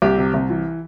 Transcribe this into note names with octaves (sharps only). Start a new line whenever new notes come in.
C2 G4
C3
C2
E3